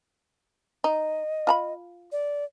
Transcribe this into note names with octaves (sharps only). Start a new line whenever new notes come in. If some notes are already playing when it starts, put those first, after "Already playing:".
D#4 D#5
F4 A#5 B5
D5